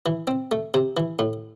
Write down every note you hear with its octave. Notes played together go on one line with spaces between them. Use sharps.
E3
C4
A3
C3
E3
A2